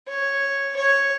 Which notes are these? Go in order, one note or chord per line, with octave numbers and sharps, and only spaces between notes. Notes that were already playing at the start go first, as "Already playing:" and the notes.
C#5
C#5